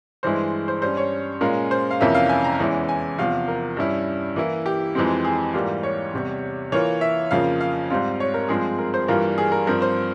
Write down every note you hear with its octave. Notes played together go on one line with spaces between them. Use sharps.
G2 E3 G#3 E4 C5
C5
G2 G3 C#4 C5
C#5
A#2 G#3 C#4 F4 A#4
C5
F5
F2 C3 E3 A#3 C#4 E5
F5
G#5
A#5
E2 E3 G#3 C#4 E4
G#5
E2 C3 F3 F5
A#4
G2 G3 C#4 E4
E3 A#3 E4
G4
F2 E3 G#3 C4
G#4
G#2 E3 G3 A#3 F4 G4
C#5
E2 C3 G3
E3 A#3 F4 C#5
E5
F2 C#3 F3 A#3 F5
F5
G#2 G3 C4 F4
C#5
A#4
G2 F3 G#3 C4 G#4
A#4
C5
G2 E3 G3 A#3 F4 A#4
G#4
A#4
G2 F3 C4 A#4
C5